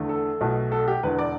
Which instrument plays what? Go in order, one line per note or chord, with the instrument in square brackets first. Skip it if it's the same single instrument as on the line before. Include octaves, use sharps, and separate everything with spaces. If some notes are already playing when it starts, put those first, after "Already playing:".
Already playing: [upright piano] E2 D3 A3
A4
B1 B2 A3
A4
G4
E1 E2 D3 B4
D5